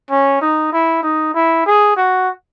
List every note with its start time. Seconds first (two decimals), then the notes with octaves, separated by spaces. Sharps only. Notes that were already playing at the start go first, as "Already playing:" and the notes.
0.10 C#4
0.42 D#4
0.73 E4
1.03 D#4
1.34 E4
1.66 G#4
1.97 F#4